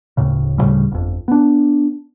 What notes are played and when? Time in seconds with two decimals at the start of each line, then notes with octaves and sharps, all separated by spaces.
0.17 D1 A2 C#3
0.58 D2 A2 C#3 G3
0.91 G1 F2
1.28 B3 D4